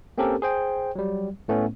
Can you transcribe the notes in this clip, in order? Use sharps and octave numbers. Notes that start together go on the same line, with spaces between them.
A#3 C4 C#4 G4 A4 A#4
G#4 C5 G5
F#3 G3
A2 A3 B3 C#4